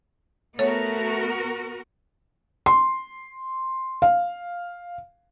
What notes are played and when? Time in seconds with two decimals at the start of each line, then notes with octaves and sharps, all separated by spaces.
0.59 A3 B3 F#4 A#4 C#5
2.66 C6
4.02 F5